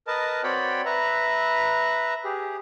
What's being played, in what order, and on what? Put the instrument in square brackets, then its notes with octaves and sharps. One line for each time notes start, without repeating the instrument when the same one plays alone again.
[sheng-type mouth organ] A#4 B4 D#5 A5
C4 F#4 C#5 D5 G5 B5
B4 E5 A#5
G4 G#4